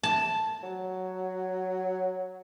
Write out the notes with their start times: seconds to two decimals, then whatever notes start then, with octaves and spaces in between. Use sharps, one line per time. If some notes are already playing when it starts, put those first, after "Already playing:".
0.03 A5
0.63 F#3